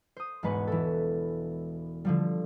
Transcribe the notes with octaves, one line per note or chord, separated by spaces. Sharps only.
C5 D#6
E1 G#2 G#3 B3 B4 C#6
E3 A4
D3 F3 G3